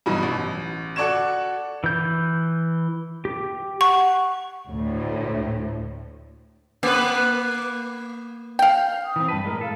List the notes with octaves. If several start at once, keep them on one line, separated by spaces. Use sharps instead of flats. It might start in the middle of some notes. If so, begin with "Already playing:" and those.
G2 B2 E3 F#3 D#4
A1
F#4 A4 D5 C#6 G#6 E7
E3 G6
G4
F#5 C#6
D2 A2
A#3 B3 B4
F5 G5
D#6
E3 C4
G2 B4 A5
A2 G#3 A#4
A4 F5